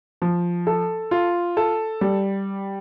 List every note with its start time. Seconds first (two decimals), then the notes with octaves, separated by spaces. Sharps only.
0.22 F3
0.67 A4
1.11 F4
1.57 A4
2.01 G3